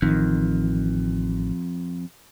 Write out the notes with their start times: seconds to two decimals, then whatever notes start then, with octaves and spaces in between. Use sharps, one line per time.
0.02 A1 F2 D#3